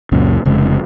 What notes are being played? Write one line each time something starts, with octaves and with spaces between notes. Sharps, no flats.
C#2 F#2 A#2 C#3
F1 C#3 G#3